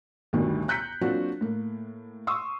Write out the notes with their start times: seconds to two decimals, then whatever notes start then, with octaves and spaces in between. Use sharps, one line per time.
0.33 G1 D2 G2 B2 D#3 G3
0.68 A#5 F#6 G6 B6 C#7
1.01 F#3 A#3 C4 D4 F4 F#4
1.41 A2 A#3
2.27 C6 C#6 D#6 E6